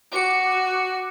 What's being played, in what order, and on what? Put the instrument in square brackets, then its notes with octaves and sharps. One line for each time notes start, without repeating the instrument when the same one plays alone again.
[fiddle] F#4 [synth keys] D6 C#7